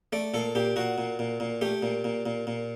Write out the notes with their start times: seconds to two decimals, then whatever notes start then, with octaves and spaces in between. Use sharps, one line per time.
0.13 A3 D5
0.34 A#2 A4
0.55 A#2 G4
0.76 A#2 F#4
0.98 A#2
1.19 A#2
1.40 A#2
1.61 A3 G4
1.82 A#2
2.04 A#2
2.26 A#2
2.47 A#2